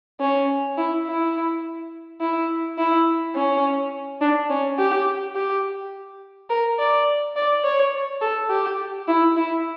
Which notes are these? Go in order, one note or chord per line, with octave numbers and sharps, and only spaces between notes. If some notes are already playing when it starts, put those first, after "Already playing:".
C#4
E4
E4
E4
E4
C#4
D4
C#4
G4
G4
A#4
D5
D5
C#5
A4
G4
E4
E4